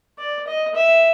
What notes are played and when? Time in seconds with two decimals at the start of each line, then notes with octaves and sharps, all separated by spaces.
0.19 D5
0.47 D#5
0.75 E5